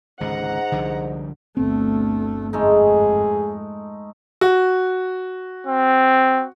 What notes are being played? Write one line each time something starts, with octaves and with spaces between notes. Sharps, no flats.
G#1 C#2 G#2 D3 F#5 A#5
C2 D3 F3 G3
G1 D2 A3 B3 C4
F2 G#2 G#3 A3 D#4 G#4
F#4
C4